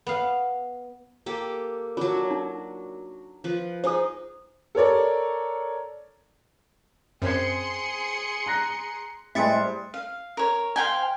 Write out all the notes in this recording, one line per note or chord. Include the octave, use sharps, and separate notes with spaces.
B3 F5
A#3 G4 A4
F#3 D4 F4
D#4
F3 B4
D#4 G#4 C5 G#5 D#6
A4 A#4 C#5 D5
F#2 C4 G#4 C5 C6 G#6 C#7
A#5 F#6 A#6
A2 G3 G#3 C5 E5 A6 C#7
F5
A#4 C#5
C5 F5 G5 G#5